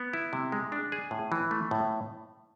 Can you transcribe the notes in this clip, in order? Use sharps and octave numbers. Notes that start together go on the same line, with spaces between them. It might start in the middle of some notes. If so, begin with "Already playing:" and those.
Already playing: B3
E4
C3
G#3
D4
G#4
A2
E3
A3
A2